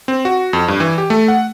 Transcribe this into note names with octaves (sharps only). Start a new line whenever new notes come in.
C4
F#4
F2
G2
E3
G4
A3
F#5